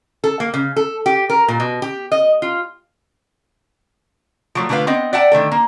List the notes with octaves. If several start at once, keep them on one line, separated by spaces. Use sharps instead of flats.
A4
A#3
C#3
A4
G4
A#4
A#2
B2
G4
D#5
F4
F3 F#3 A3
D3 A3 F4 A4 B4 F5
B3 C4 D#5
D5 E5 F#5 G5 A5
D3 D#3 A3 A4
A#3